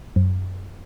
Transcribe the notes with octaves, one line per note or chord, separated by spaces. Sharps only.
F#2